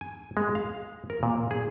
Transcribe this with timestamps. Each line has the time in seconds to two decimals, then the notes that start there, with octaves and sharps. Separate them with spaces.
0.01 G#5
0.37 G#3
0.55 F5
1.10 A#4
1.23 A#2
1.51 G#4